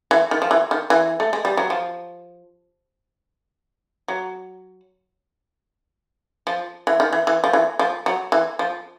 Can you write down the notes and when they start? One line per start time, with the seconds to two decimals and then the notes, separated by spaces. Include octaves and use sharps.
0.11 E3
0.31 D#3
0.42 F3
0.51 E3
0.71 D#3
0.90 E3
1.20 A3
1.33 G#3
1.45 G3
1.57 F#3
1.70 F3
4.08 F#3
6.47 F3
6.87 E3
7.00 D#3
7.13 E3
7.27 E3
7.44 F3
7.53 E3
7.79 F3
8.06 F#3
8.32 E3
8.59 F3